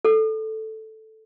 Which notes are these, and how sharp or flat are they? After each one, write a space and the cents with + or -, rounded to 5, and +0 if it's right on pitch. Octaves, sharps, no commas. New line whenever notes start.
A4 +0